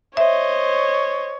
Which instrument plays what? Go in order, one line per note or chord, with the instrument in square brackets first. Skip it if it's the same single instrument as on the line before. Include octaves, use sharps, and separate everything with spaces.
[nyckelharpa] C5 D#5 [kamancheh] C#5 [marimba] E5